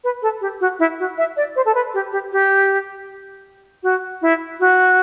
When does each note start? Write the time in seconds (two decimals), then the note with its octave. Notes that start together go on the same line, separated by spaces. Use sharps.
0.04 B4
0.22 A4
0.41 G4
0.61 F#4
0.79 E4
0.99 F#4
1.18 E5
1.37 D5
1.56 C5
1.65 A4
1.75 B4
1.94 G4
2.12 G4
2.32 G4
3.83 F#4
4.22 E4
4.60 F#4